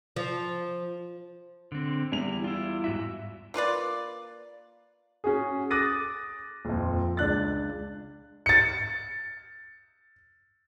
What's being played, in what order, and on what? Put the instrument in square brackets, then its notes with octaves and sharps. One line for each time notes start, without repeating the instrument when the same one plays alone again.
[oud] F3
[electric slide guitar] D3 C4
[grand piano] E2 G3 F7 [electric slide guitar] E4
[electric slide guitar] E4 F4
G#2 F#4 E5
[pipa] A#3 F4 B4 D5
[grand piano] C#4 F#4 G#4
D6 D#6 F#6 A6 A#6 D#7
D#1 F2
C#2 D4 F#6 A6
[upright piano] A6 C#7